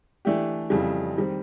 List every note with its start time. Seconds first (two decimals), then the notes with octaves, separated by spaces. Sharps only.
0.25 E3 A3 D4 G4
0.70 F2 C#3 E3 G3
1.17 D#3 G3 C4